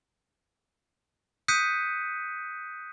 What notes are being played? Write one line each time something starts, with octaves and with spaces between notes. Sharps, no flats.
D#6 F#6 G6 B6 C#7 D#7